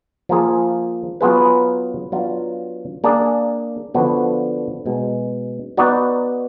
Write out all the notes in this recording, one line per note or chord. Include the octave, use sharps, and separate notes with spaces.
F3 A#3 F4 G#4
F#3 B3 F4 G#4 B4
F#3 B3 D4 F4
A#3 D4 G#4 D5
D3 F3 B3 D4 F#4
B2 G#3 D#4
B3 D#4 F#4 D5